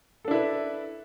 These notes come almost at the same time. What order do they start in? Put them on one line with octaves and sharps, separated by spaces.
A4 D4 E4 B4